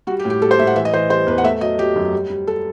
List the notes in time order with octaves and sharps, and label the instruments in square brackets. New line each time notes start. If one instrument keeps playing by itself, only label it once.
[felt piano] G3 F#4
G4
A2
G4
G3 A4
C5
A2 E5
F#5
E3 E5
D#5
E3 C5
G3 C5
E2 B4
F#5
A3 E5
F#3 D#5
F#3 G4
F#2
G3
G3
A4